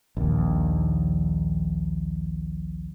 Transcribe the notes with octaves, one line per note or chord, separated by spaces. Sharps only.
A#1 D#2